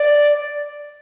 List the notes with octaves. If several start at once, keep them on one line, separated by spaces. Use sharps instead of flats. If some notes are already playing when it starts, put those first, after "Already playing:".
Already playing: D5